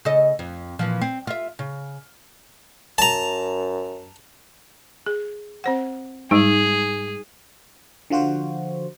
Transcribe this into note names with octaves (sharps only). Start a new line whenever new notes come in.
C#3 A4 D#5
F2
A#2 E3 F3
C4
F4 E5
C#3
F#2 A5 A#5
G#4
C4 C5 F#5
G#2 G3 D#4 G#4
D3 F3 F4 F#4 C5